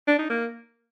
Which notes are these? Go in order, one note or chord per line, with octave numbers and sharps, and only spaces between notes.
D4
D#4
A#3